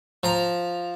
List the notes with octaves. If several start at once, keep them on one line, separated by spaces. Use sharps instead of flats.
F3 A#5